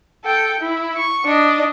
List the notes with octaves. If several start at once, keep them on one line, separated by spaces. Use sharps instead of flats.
A4 G5
E4
C#6
D4 D#5